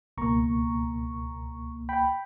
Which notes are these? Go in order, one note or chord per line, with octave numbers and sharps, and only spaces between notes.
C#2 B2 A#3 A#5 C#6
G5 B5